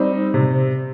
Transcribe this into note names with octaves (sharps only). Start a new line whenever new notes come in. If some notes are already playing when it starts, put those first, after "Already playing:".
Already playing: G3 C4 D#4
C3